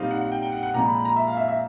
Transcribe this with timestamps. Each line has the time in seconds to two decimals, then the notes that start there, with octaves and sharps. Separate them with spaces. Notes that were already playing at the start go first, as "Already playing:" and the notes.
Already playing: A#2 G3 C4 D#4 F5
0.11 F#5
0.21 F#5
0.31 G5
0.42 G5
0.52 F#5
0.63 F#5
0.74 A#2 F3 G#3 A#5
0.85 B5
0.95 B5
1.05 A#5
1.16 E5
1.27 F5
1.37 E5
1.48 E5